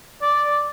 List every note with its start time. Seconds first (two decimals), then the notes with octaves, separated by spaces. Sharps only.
0.22 D5